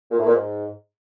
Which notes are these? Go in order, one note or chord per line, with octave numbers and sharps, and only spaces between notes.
A#2
A2
A#2
G#2